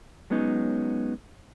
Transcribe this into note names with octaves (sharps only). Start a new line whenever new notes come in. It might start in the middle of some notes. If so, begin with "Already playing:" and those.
F#3 G#3 B3 C#4 D#4